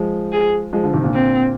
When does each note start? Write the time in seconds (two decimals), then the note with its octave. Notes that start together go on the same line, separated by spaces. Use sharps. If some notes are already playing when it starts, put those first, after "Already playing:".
Already playing: F3 G#3
0.32 G#4
0.73 F3 G#3
0.83 D3 F3
0.93 C3 D#3
1.03 A#2 D3
1.14 C4